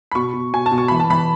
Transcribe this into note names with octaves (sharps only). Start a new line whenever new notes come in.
B5
B2 C#6
B2
B2 G#5
A5
B2
C#6
E3 B5
A5
E3 B5